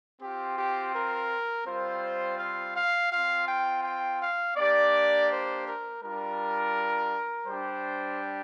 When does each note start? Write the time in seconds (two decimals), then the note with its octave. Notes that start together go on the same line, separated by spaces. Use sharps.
0.20 C4 F4 G4
0.57 G4
0.93 A#4
1.65 G3 C4 F4 C5
2.39 F5
2.75 F5
3.11 C4 F4 F5
3.47 G5
3.83 G5
4.20 F5
4.56 A#3 D4 G4 D5
5.30 C5
5.65 A#4
6.01 G3 D4 F4 A#4
7.47 G3 D4 G4 C5